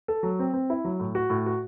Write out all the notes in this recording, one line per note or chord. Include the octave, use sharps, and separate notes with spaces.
A4
F#3
C4
C4
E4
F#3
A2
F#4
A2
F#4